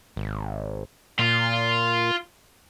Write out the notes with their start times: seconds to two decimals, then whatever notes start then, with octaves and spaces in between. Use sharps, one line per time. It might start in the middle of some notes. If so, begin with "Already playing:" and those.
0.16 G#1
1.19 A#2 F4